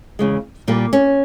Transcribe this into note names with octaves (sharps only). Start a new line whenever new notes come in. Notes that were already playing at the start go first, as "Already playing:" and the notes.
E2 C#3 G#3
A#2 G3 A#3
C#4